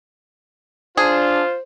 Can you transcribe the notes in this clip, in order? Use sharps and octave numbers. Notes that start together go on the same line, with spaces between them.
D4 F4 G#4 C5